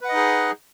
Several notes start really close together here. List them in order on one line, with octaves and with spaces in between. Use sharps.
B4 F#5 D#5 D#4 G#4